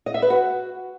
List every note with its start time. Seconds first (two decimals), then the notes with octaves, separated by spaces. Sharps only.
0.06 D#5
0.14 E5
0.22 B4
0.30 F#4